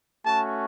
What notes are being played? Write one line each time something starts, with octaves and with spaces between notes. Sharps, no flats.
A3 C#4 F#4 A5